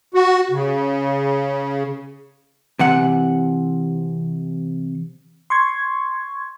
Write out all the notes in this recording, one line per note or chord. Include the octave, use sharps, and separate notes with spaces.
F#4
C#3
C3 E3 F#5
C6 C#6 G#6